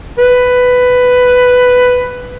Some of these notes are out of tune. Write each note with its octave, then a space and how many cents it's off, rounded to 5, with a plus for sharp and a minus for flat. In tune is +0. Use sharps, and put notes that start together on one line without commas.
B4 +10